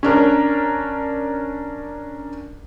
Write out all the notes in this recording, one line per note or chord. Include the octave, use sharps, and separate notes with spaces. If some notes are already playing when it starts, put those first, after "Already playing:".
C#4 D4 A#4 D5